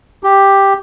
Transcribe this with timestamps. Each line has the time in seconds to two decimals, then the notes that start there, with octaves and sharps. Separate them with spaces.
0.23 G4